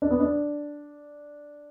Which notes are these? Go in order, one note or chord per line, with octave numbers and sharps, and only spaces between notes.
D4
B3
D4